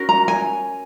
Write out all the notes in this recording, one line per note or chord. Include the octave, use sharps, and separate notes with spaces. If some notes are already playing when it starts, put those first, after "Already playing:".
Already playing: C#4 F#4 A#4
A#5
G#5